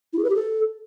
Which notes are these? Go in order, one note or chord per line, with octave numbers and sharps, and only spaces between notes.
E4
G#4
B4
G4
A4